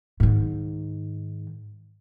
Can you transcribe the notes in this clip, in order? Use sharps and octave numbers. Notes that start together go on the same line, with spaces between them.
G#2 D#3